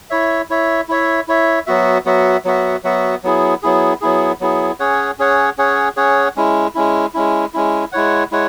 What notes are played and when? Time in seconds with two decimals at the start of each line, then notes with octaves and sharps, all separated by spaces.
0.10 E4 C#5 E5
0.50 E4 C#5 E5
0.89 E4 C#5 E5
1.28 E4 C#5 E5
1.67 F#3 B3 F#4 E5
2.05 F#3 B3 F#4 E5
2.45 F#3 B3 F#4 E5
2.84 F#3 B3 F#4 E5
3.23 F#3 B3 E4 G#4
3.62 F#3 B3 E4 G#4
4.01 F#3 B3 E4 G#4
4.40 F#3 B3 E4 G#4
4.80 C#4 G#4 C#5 F#5
5.19 C#4 G#4 C#5 F#5
5.58 C#4 G#4 C#5 F#5
5.96 C#4 G#4 C#5 F#5
6.36 G#3 C#4 E4
6.75 G#3 C#4 E4
7.14 G#3 C#4 E4
7.54 G#3 C#4 E4
7.92 G#3 E4 C#5 F#5
8.31 G#3 E4 C#5 F#5